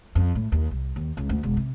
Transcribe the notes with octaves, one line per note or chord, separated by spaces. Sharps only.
F2
A2
D#2
C2
D#2
C#2
D2
E1
C3